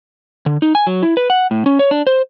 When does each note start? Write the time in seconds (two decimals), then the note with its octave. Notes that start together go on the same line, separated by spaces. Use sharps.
0.46 D3
0.62 D#4
0.75 G#5
0.87 F#3
1.03 E4
1.17 B4
1.30 F#5
1.51 A2
1.66 C#4
1.79 C#5
1.91 D4
2.07 C5